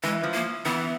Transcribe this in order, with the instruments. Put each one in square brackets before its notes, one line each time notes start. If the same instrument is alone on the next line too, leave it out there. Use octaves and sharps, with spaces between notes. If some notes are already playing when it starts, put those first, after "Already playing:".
[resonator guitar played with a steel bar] E3 [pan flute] G#3
[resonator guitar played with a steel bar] F3
[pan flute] A#3
[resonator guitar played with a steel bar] E3 [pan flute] B3